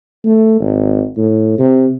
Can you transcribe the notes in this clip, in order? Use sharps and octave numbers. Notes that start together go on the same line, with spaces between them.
A3
G#1
A2
C3